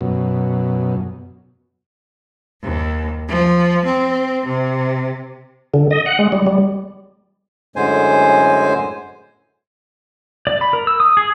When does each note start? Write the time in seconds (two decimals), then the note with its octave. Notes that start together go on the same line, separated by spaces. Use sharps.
0.01 F#2 B2
2.61 D#2
3.26 F3
3.84 C4
4.45 C3
5.74 D3
5.91 D#5
6.06 F#5
6.19 G#3
6.32 G3
6.46 G3
7.76 F#2 A2 D3 G#3 C5 G#5
10.47 D5
10.61 B5
10.73 A#4
10.87 E6
11.00 D#6
11.17 G#4